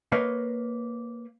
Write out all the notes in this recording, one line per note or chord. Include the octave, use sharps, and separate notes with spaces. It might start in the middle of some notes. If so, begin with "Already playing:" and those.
A#3 B4 C#5 D#5 F5